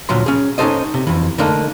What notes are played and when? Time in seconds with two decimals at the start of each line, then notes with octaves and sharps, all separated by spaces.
0.09 D2 A#2 F3 F#3 C6
0.26 C#4 G#4
0.58 C#4 D#4 F#4 A4 C5 D#5
0.94 C3
1.07 F2 E3
1.38 D3 A3 A#3 D4 D#4